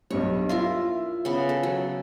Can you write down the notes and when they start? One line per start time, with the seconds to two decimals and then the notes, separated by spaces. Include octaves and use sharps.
0.11 B1 G2 G3 C#5
0.49 E4 F4 A#4 E5 F5
1.25 C#3 B3
1.49 A4
1.63 F#3